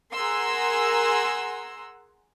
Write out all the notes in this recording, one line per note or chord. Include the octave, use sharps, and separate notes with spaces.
G#4 A#4 F#5 A#5 C6 E6